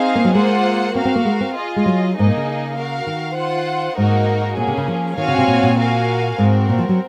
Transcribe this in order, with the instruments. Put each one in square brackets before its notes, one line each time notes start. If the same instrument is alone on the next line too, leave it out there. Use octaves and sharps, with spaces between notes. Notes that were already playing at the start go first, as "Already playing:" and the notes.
Already playing: [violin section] C4 D#4 G#4 C5 F5
[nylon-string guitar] A#3
F#3
[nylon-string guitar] G#3 [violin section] A#3 F4 C5 F#5
[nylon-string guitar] C4 [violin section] F#4 A#4 F5
[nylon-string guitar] C4
A#3
G#3
C4
[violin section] F4 G#4 D#5
[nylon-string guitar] G#3
F#3
[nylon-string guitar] G#2 [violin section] A#3 D#4 G#4 D#5
[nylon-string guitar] A#2
C#3
[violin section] F#4 A#4 F5
[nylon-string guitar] D#3
[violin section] F4 C5 F#5
[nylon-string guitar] G#2 [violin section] A#3 D#4 F#4 A#4
[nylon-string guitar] A#2 [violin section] A#3 C#4 G#4
[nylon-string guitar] C3
C#3
F3
[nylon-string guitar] D#3 [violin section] C4 F#4 C#5 F5 G#5
[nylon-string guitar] C#3
C3
A#2
A#2
[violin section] F#4 A#4 F5 G#5
[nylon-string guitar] G#2 [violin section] C4 F#4 A#4
[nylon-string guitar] A#2
F3
F#3